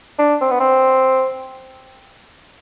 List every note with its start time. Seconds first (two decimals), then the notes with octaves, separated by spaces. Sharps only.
0.19 D4
0.41 C4
0.51 B3
0.60 C4